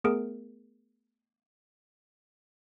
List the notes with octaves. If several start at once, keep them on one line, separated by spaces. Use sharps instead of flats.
A3 B3 G#4 A#4 D7